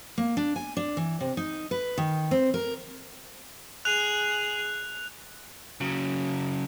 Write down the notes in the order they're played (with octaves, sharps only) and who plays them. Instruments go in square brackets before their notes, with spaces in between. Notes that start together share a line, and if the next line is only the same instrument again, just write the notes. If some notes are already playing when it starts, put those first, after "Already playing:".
[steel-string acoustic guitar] A#3
D4
G#5
D4
E3
C3
D#4
B4
D#3
C4
A#4
[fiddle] G#4 [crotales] F#6 F7
[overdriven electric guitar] C#3 F#3